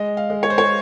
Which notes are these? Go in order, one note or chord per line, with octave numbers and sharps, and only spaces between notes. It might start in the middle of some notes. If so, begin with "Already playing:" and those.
Already playing: G#3 D#5
F5
G#3
C#5
C5
C#5